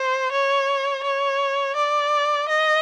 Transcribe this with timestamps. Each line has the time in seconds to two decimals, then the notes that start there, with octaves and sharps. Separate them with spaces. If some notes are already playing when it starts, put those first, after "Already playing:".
Already playing: C5
0.32 C#5
1.04 C#5
1.76 D5
2.48 D#5